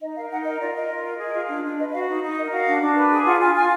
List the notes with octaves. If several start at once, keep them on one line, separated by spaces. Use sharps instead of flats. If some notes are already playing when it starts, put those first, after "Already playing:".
D#4 D#5
A#4 F5
D#4 F#5
A#4 D#5
F4 D5
A#4 D#5
F4
A#4
G#4 D#5
F4
D4
D4
B4 D#5
F#4 F5
D#4
D#4
A#4 D#5
F#4 F5
D4
D4
B4
G#4
F4 F#5
F4 G#5
F4 G#5